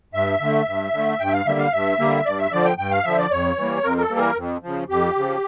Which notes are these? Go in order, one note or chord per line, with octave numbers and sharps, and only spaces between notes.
G2 E5
D3 A3
G2
D3 A3
G2 G5
E5
F5
D3 G3 A#3 E5
F5
G2 E5
D3 G3 A#3
G2 D5
E5
D3 F3 D5
G5
G2 G5
F5
D3 F3 E5
D5
F2 C#5
E3 G3 A#3
F2 A#4
A#4
A4
E3 G3 A#3
A#4
F2
C#3 F3
F2 G4
C#3 F3